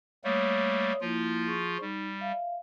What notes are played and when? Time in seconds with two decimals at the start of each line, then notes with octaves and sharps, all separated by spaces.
0.24 G3 A3 A#3 C#5 D#6
1.01 F3 A#3 E4 F4
1.47 G#4 C#6
1.81 G3 D#4
2.20 E5 F5